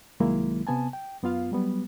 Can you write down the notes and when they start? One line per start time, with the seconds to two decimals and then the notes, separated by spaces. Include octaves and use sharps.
0.20 C2 D#3 F#3 G#3 A#3 E4
0.67 C3 B3 G#5 A5
0.93 G5
1.23 F#2 B3 F4 F5
1.51 F#3 G3 B3